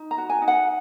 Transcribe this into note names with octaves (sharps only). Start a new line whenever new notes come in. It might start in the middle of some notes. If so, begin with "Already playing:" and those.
Already playing: D#4
A#5
F#4
G#5
D#4
F#5